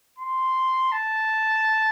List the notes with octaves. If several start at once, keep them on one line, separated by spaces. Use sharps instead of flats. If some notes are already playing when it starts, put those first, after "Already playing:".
C6
A5